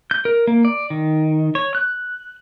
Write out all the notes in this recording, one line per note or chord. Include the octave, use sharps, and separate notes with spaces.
G6
A#4
A#3
D5
D#3
C#5
F#6